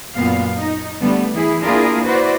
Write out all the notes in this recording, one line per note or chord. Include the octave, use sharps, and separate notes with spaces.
F#2 A#2 B3 F5
D#4
D3 G3 A3 B3
E3 E4 G#4
A#3 D4 E4 F4 G#4 A#4
E4 F#4 B4 C5 D5